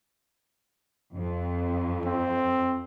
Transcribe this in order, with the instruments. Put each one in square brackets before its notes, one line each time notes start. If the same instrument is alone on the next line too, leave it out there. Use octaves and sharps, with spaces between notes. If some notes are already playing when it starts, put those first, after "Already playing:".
[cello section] F2
[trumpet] C4